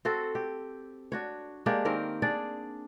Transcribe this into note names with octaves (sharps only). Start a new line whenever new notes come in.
C4 F#4 A4 C5
G4
D4 F#4 C#5
G#3 A#3 D4 G4
D#3 C4 G4 A#4
D4 G#4 D5